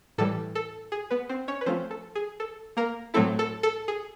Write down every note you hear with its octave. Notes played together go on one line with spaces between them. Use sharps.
A2 E3 G3 A4
A4
G#4
B3 B4
C4 C5
C#4 C#5
B4
F3 A3 C4 C#4 F4 C5
A4
G#4
A4
A#3 A#4
A2 F#3 A3 C4 E4 A4
A4
A4
G#4